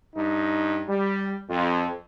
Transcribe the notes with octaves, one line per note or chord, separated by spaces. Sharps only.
G2 D#4
G3
F2